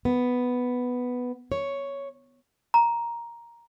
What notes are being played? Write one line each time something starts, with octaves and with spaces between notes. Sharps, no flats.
B3
C#5
A#5